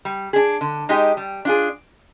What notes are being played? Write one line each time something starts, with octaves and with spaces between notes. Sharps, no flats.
G3
D4 G#4
D3
G#3 D#4 G4
G3
D4 F4 G#4